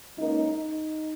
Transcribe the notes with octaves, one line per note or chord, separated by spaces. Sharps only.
C#2 C#3 A#3 D#4
D#4